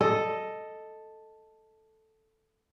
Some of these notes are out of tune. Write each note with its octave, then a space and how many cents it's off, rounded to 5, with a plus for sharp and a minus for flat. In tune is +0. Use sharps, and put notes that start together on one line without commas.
A4 +0 D#5 +0